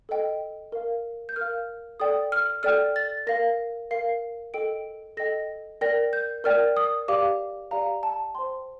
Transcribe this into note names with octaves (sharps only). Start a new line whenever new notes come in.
A4 D#5 G5
A#4 F5
G6
A#4 F5 F6
A4 D5 G5 D#6
F6
A4 D5 G5 F6
A6
A#4 F5 A#6
A#4 F5 C7
A4 D#5 G5 D7
A4 D#5 G5 A#6
A#4 D5 G5 A#6
G6
A#4 D5 G5 F6
D#6
G4 D5 F5 D6
G4 D5 F5 A#5
A5
C5 G5 C6